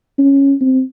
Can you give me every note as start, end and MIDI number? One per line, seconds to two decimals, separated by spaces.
0.19 0.54 61
0.61 0.82 60